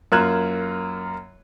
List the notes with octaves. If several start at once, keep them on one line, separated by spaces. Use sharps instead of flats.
F#2 A#3 F4 F#6 G#6 E7